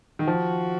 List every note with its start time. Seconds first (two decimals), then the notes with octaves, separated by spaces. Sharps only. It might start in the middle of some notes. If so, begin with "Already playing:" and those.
0.19 D#3
0.27 F3 F#4